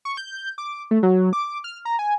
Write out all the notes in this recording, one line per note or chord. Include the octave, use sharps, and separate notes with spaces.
C#6
G6
D6
A3
F#3
D6
F6
A#5
G#5